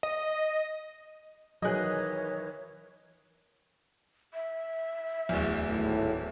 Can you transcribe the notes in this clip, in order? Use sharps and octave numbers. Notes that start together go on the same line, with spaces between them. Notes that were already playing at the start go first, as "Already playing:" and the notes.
D#5
D#3 E3 F#3 G#4 C#5 D#5 F#6
E5
D1 E2
G#1 A2